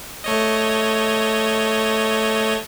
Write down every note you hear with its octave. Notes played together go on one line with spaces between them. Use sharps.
A3 C#5 D#5